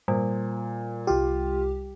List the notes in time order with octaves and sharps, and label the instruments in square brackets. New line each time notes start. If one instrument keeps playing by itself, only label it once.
[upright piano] A#2 [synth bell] G3
[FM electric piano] C2 G4 [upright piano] F4